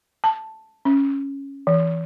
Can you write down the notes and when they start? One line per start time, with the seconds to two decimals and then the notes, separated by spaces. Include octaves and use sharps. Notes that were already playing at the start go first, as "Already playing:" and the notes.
0.24 A5
0.85 C#4
1.67 E3